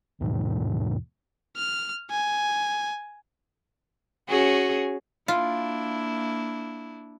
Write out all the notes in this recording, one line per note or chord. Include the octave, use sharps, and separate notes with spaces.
D#2 G#2 B2 E3
F6
G#5
C#4 F#4 G#4
A#3 D4 E4 F4